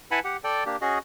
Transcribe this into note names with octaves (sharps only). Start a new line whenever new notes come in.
E4 B4 F#5 G#5 A5 B5
G4 F#5
A4 D5 G5
A#3 D4 G4
C#4 F#4 G#4 D#5